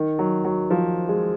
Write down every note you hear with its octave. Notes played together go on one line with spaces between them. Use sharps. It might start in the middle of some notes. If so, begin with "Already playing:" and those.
Already playing: D#3
F#3
F#3
F3
G#3